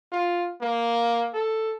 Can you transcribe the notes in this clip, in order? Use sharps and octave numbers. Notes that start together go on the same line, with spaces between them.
F4
A#3
A4